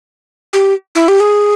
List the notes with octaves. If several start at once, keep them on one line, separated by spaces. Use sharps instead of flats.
G4
E4
G4
G#4